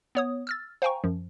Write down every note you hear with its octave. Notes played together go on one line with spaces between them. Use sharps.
B3 C#5 D#6
E6 F6 A6
C5 F5 G5 G#5 A#5 C#6
F#2 F3